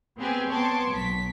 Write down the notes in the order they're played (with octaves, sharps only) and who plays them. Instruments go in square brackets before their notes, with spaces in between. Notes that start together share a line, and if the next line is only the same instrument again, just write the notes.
[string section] B3 C4 G4 G#4 B4 G#5
B3 C#5 A5 C6 D6
B1 B6